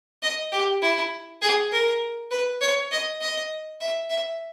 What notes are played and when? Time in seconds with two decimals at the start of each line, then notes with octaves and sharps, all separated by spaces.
0.23 D#5
0.52 G4
0.82 E4
1.42 G#4
1.72 A#4
2.31 B4
2.61 C#5
2.91 D#5
3.21 D#5
3.80 E5
4.10 E5